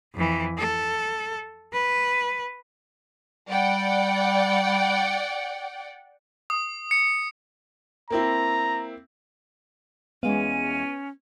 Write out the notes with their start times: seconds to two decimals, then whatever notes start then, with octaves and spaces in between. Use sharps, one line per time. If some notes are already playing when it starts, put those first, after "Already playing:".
0.15 F2 E3
0.58 A4
1.73 B4
3.49 G3 D5 F#5 G5
6.50 D#6
6.91 C#7
8.10 A#3 C4 E4 A#5
10.23 E2 G#3 B3 C#4 F5 D#7